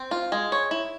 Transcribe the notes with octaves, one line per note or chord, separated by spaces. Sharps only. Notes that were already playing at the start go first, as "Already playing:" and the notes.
Already playing: C4
F4
G#3
C#5
E4